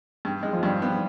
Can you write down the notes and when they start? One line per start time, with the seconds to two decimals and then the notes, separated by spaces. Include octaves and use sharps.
0.25 G2
0.43 G#3
0.53 F3
0.63 G2 G3
0.82 B3